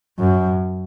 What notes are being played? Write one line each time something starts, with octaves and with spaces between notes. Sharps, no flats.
F#2